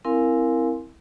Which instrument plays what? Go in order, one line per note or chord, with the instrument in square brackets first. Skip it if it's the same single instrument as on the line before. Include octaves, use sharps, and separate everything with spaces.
[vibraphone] C4 E4 A#4 F5 G#5 C6